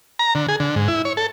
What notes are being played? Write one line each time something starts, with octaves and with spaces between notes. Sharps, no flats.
A#5
D3
G#4
D3
G#2
E4
C#5
A4